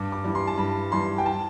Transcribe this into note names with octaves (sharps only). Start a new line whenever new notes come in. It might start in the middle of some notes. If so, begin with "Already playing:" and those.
Already playing: G2 D6
D6
E3 G3
C6
A5
G2 B5
E3 G3 C6
G5
A5